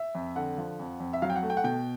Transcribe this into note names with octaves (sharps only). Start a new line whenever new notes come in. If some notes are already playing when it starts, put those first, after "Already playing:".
Already playing: E5
F2
D3 F#5
F3
F2
F2
E5
F#3 F5
G5
F#5
A3
G5
F#5
B2 G5